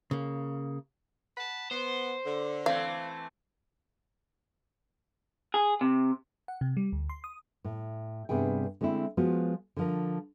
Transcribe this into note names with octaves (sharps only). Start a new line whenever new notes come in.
C#3 A#3
F#5 A5 B5
B3 C5
D3
E3 A3 C4 F5
G#4
C3
F#5
C3
G3
D2
C6
D#6
A2
G2 C3 B3 G#4 G5
D3 G#3 A3 C4 E4
F3 G#3 B3 F4 F#4
D3 F3 A#4